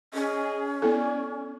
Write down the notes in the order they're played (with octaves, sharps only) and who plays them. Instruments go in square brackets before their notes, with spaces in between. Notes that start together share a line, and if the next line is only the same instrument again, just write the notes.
[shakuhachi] C#4 [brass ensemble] G#4 D#5
[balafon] B3 E4 A4 [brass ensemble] D5 G#5